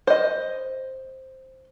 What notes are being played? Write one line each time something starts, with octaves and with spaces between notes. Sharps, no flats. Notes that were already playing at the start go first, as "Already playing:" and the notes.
C5 D#5